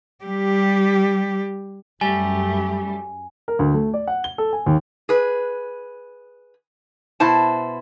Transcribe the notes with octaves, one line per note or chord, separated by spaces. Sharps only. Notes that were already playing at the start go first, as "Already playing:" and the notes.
G3 G4
F#2 G3 A3 G4 G#5
A#4
D2
A3
D5
F#5
G7
A4
G#5
D#2
G#4 B4
B2 E4 C5 A5